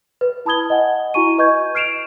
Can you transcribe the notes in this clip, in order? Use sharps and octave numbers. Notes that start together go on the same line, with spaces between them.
B4
E4 A5 B5 D#6 G#6 G7
D#5 F#5 G#5
E4 F#4 G#5 C#6 D#7
B4 D#5 C#6 G6 G#6
F6 C7 D7 E7 F7